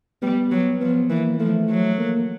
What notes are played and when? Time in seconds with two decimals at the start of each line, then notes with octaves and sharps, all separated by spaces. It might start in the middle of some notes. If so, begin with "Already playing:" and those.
0.22 G3 B3
0.52 F#3
0.80 F3 B3
1.10 E3 A#3
1.40 F3 A3
1.69 F#3
1.98 A#3